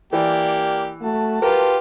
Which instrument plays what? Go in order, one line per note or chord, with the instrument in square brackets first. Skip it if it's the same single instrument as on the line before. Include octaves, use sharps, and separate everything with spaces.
[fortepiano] E3 [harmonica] A#3 G4 [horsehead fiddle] D5
[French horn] A3 [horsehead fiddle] F#4 A5
[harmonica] F4 G4 [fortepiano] A#4 [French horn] B4